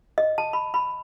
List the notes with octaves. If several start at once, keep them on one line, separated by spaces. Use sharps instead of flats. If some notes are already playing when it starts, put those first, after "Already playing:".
D#5
A5
B5
B5